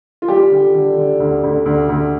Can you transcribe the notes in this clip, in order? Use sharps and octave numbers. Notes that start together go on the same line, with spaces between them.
F4
G3 G4
D3
D3
D3
D2
D2
D2
D2